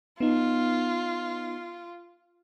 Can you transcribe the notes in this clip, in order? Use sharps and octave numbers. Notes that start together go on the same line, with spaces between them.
B3 D#4 F4